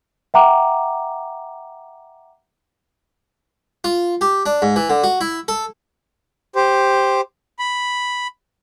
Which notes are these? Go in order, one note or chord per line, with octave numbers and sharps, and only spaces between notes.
E5 F#5 G5 A#5 D6
F4
G4
D4
G#2
E3
D3
F#4
E4
A4
G4 C5
B5